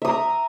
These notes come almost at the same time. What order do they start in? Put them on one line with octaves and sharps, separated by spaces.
E5 D#6 A#5